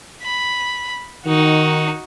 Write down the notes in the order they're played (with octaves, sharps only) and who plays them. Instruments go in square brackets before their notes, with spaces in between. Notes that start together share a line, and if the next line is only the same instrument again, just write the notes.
[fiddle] B5
[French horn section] D#3 [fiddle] D#4 F#4